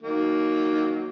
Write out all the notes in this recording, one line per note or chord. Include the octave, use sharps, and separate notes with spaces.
D#3 F#3 A#3